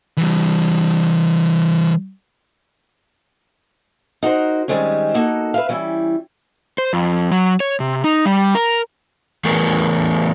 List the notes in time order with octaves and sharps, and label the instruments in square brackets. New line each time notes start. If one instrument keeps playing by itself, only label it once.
[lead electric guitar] E3 G3
[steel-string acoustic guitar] D#4 F#4 A#4 C5
D#3 E3 G3 G#3 C4 C#4
A#3 D#4 F#4 A4
B4 E5 F5
E3 G3 C#4 E4
[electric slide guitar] C5
F2
F#3
C#5
C3
D#4
G3
A#4
E3 A3 B3 G#4 A#4